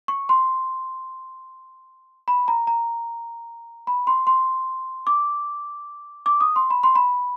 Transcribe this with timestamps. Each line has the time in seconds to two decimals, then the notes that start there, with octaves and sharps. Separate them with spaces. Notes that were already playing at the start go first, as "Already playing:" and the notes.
0.08 C#6
0.29 C6
2.28 B5
2.48 A#5
2.67 A#5
3.87 B5
4.07 C6
4.27 C6
5.07 D6
6.26 D6
6.41 D#6
6.56 C6
6.70 B5
6.83 C6
6.95 B5